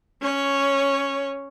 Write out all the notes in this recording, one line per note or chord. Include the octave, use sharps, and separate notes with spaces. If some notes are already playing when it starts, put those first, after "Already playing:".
C#4 C#5